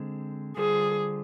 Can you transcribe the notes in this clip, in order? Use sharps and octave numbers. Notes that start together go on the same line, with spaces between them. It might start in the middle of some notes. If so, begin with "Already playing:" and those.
Already playing: D3 G#3 C4
D3 G3 D4 F4 G#4 C5